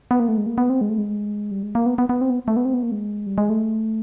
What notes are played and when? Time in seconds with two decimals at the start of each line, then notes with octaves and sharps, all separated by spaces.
0.11 B3
0.20 A#3
0.28 A3
0.37 G#3
0.46 A#3
0.58 B3
0.70 C4
0.81 G#3
0.90 A3
0.98 G#3
1.51 G3
1.63 G#3
1.75 A#3
1.86 B3
1.98 B3
2.09 B3
2.21 C4
2.30 B3
2.48 A3
2.57 B3
2.65 C4
2.74 B3
2.83 A#3
2.92 G#3
3.26 G3
3.38 G#3
3.50 A3